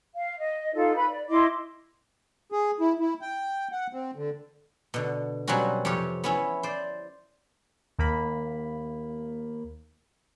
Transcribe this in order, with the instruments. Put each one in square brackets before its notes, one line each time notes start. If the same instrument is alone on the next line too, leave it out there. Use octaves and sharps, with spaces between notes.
[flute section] F5
D#5
D#4 F4 A4
B4 B5
D5
E4 D#5 C6 D6
[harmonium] G#4
E4
E4
G5
F#5
C4
D3
[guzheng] B2 D3
B2 F#3 G3 C4 C#4 F#4
F2 C3 F4 G4 C#5
B3 C#4 E4
C5 D5
[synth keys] D#2 A#3 B5